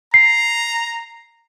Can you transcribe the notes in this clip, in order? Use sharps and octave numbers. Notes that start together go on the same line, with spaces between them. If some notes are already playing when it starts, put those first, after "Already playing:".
A#5 C7